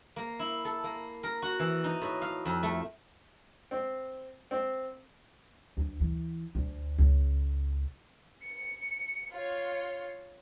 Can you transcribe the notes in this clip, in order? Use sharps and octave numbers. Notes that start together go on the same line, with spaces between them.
A#3
E4
A4
A#3
A#4
F#4
E3
D#4
A2
F5
F2
A3
C4
C4
D2
E3
D2
C#2
C#7
F4 C#5